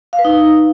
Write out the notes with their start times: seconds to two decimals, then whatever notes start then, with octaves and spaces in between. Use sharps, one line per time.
0.13 F5
0.19 B4
0.25 D#4